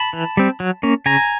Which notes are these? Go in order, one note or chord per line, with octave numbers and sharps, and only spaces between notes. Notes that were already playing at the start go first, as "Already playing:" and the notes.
Already playing: A5 B5
E3
G3 C4
F#3
A#3 C#4
C#3 G#5 A#5